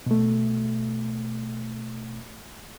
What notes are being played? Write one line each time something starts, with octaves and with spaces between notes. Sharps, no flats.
B2 A3